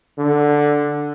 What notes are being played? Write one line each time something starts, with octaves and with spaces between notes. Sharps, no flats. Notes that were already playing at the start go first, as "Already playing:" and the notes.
D3